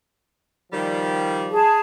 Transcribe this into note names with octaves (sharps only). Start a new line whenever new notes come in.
D#3 F3 G3
G#4 A5